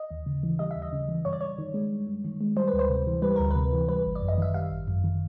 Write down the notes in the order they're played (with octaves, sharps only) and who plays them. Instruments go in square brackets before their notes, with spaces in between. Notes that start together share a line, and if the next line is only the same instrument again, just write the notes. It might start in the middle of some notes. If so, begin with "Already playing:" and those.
Already playing: [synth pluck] D#5
D#2
C#3
E3
G3 D#5
E5
D#2
D#5
C#3
E3
G2 C#5
D5
G2 C#5
D#3
G#3
G2
G2
D#3
G#3
G3 C5
B4
D2
C5
C3
E3
G3 B4
D2 A#4
C3 B4
E3
G3 B4
G#1
D5
F#2
D#5
D#3 E5
G3 F5
G#1
F#2
D#3